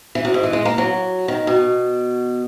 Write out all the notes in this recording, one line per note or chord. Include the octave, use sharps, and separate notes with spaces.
E3
F#2
G#2
E3
G#3
A#3
F#3
D#3
B2